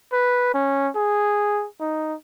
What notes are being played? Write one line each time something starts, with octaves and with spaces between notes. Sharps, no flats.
B4
C#4
G#4
D#4